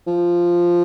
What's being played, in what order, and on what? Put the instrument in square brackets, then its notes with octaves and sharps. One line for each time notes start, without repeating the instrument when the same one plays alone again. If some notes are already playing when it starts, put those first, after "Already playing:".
[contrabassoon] F3